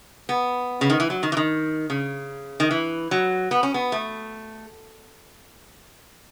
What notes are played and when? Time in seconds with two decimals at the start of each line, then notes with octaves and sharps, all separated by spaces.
0.29 B3
0.81 C#3
0.90 D#3
1.00 E3
1.10 F#3
1.23 D#3
1.32 E3
1.37 D#3
1.90 C#3
2.60 D#3
2.71 E3
3.11 F#3
3.51 B3
3.63 C#4
3.74 B3
3.92 A3